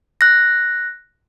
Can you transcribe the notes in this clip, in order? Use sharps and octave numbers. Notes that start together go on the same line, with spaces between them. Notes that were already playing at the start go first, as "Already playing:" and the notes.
F#6 A#6